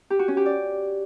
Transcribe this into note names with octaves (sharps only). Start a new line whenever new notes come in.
G4
F#4
C#4
G4
D5